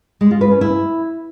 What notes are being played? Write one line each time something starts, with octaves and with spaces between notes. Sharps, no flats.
G#3
F4
B4
C#4
E4